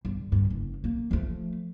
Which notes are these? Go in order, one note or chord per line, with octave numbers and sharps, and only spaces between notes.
G1
G2 D3
F#1
A#3
F3 A3